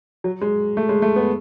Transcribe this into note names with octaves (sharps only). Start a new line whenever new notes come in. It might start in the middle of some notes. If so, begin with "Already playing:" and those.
F#3
G#3
A3
G#3
A3
B3